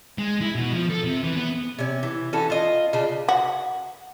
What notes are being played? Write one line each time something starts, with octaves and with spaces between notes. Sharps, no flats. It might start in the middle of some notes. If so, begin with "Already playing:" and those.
G#3
E4
B2
F3
A4
C3
E3
B3
C3 C#4
E3
E3 C#4 F#4 A4
F4 D#5
C#3 D4
F#4